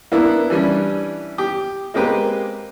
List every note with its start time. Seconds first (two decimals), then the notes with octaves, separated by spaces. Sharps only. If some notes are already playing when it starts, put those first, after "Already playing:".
0.12 A#3 B3 D4 E4
0.50 E3 G3 C#4 D4
1.38 G4
1.94 G#3 A#3 C4 G4 B4 C5